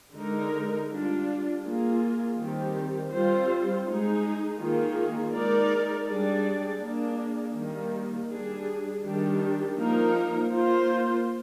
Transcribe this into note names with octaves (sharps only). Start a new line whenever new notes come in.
D3 G#3 D#4 A#4
G3 D4 F4
A#3 F4 G#4
D#3 G3 C4 G4
G3 C4 F4 C5
G#3 D#4 G#4
D#3 A#3 F4 G#4
G#3 D#4 A#4 D5
G3 D4 G#4 D5
A#3 D4 G#4
D#3 G3 A#3
G3 D4 G#4
D#3 G3 D4 G4
F3 A#3 D#4 A#4
A#3 F4 C5